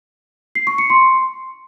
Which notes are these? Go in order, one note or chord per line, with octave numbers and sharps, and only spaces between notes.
C7
C#6
C#7
C6